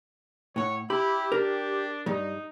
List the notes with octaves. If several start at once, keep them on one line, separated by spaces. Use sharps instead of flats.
A2 C#5 F#5
E4 G4 B5
D4 A#4
G2 G3 D#4